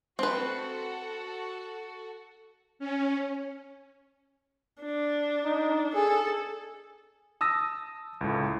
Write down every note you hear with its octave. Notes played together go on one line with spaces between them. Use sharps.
C4 F#4 A4 B4 F#5
C#4
D4
D#4
G#4 A4
A5 D#6 E6 A#6
C#2 A2